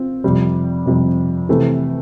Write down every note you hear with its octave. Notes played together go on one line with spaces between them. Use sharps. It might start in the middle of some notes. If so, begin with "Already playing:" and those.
Already playing: C4 F4
F2 C3 G3
F2 C3 G3
C3 E3 A3